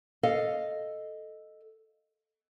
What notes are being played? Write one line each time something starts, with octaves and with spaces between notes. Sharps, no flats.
A4 D#5 F5